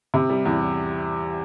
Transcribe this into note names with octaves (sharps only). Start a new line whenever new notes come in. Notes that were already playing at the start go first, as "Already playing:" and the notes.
C3
G3
E2